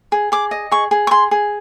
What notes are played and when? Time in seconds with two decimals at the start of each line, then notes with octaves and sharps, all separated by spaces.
0.12 G#4
0.32 G#4 D6
0.51 D#5
0.72 G#4 C#6
0.91 G#4
1.07 C#6
1.11 G#4 C6
1.31 G#4